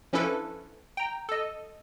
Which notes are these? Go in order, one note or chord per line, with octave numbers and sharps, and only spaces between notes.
F3 C#4 D4 E4 A4 B4
G5 A#5
A4 D#5